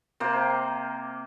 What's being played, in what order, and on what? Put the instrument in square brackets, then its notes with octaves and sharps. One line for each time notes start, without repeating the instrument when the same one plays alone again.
[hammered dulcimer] C3 A#3 C5